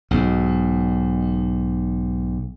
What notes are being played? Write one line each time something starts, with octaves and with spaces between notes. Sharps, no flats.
B1 G#2